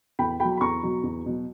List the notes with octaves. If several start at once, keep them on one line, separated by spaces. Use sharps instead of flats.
E2 G5 B5
B2 F#3 G5 B5
B5
E2 A#5 C#6
B2 F#3
E2
B2 F#3